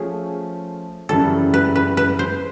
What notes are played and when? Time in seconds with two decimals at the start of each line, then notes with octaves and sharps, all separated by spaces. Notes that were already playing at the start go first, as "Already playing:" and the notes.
Already playing: F3 A3 C#4 G#4
1.09 F#2 C#3 E3 G3 A4
1.54 B4
1.76 B4
1.97 B4
2.19 C5